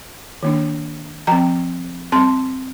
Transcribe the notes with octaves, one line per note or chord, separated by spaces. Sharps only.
D#3 A#3 D4
F3 C4 G5 A#5
G3 C4 A5 C6